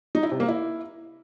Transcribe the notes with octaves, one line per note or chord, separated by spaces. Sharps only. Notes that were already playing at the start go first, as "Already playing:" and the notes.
D#4
E4
C3
A#3
E4